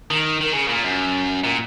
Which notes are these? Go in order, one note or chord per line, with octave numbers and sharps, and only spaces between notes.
D#3
D#3
C#3
A#2
F#2
A#2